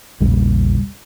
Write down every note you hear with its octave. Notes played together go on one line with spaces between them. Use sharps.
A#1 E2 C#3 G3